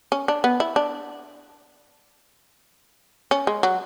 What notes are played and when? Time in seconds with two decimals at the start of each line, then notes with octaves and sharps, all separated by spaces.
0.12 C#4
0.28 D4
0.44 B3
0.60 E4
0.76 D4
3.31 C#4
3.47 G#3
3.63 F#3